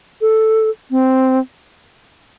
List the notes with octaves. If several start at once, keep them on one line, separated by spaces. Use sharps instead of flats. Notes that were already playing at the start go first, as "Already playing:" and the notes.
A4
C4